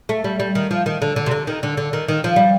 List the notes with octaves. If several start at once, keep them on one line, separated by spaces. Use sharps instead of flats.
A3
G3
G3
D#3
F3
D#3
D3
D3
C3
D3
D#3
D3
D3
D#3
D#3
F3
G3